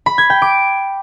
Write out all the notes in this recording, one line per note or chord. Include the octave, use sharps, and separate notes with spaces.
B5
G#6
G5
D6